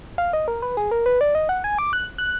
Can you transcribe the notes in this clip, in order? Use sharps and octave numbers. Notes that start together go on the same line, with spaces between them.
F5
D#5
A#4
B4
G#4
A#4
B4
D5
D#5
F#5
G#5
D6
F#6
F#6